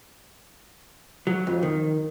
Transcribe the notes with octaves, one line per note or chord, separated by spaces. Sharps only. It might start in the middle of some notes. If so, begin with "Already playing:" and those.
F#3
F2
D#3